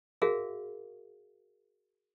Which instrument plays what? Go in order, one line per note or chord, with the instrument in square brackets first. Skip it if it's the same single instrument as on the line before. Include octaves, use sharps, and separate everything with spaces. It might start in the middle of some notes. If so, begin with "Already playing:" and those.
[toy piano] F#4 G#4 A#4 E5 F5